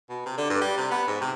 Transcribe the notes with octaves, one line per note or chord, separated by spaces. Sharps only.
B2
C3
D3
G2
G3
C3
B3
G#2
C3